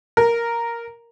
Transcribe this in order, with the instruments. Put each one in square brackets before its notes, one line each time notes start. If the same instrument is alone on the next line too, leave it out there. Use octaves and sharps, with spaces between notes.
[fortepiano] A#4